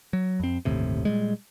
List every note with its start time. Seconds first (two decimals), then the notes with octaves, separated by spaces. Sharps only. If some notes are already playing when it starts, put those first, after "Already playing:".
0.13 F#3
0.40 F2 C4
0.65 G1 D#2 A2 C3
1.05 A#2 G3 G#3